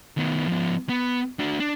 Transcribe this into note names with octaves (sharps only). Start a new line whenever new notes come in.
D#3 B3
F3 B3
B3
D4 F#4
D4